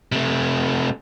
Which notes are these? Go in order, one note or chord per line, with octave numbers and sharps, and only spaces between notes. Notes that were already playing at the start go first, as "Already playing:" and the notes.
C3 A3